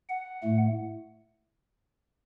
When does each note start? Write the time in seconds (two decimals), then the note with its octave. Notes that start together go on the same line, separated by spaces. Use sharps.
0.09 F#5
0.43 A2 A3